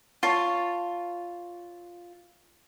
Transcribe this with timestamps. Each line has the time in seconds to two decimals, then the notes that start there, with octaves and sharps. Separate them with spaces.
0.23 F4 C#5 A5